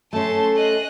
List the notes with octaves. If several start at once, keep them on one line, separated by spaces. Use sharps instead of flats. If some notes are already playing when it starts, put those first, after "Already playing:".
A3 C#4 A5 C6
D#5 F#6